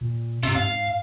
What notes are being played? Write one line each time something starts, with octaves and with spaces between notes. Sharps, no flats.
A#2
G#2 C3
G#2 F5